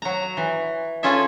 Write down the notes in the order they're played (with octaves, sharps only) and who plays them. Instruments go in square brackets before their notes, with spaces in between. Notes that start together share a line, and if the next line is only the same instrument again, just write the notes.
[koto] F#3 A#5
E3
C#4 E4 F4 G#4 A4 E5